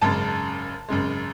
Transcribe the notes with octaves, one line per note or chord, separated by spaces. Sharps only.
G#1 F#2 C#3 G#3 A5
G#1 F#2 C#3 G#3